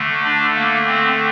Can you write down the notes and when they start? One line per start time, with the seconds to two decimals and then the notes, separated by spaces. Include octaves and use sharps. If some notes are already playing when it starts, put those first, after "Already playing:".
Already playing: D3 A3
0.24 D4
0.56 A#3
0.87 C4